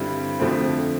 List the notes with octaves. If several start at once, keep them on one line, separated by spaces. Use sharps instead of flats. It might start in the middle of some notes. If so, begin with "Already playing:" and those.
Already playing: G2 D3 G3 C4 E4
F2 D3 F3 A3 C4